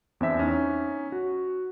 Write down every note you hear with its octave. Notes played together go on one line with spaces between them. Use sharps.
E2 C4 D4 E5 B6
C#4 D#4
F#4